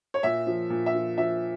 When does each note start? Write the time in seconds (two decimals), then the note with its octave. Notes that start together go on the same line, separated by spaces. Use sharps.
0.14 C#5
0.23 A#2 E5
0.47 F3
0.70 A#2
0.86 E5
0.94 F3
1.18 F3 E5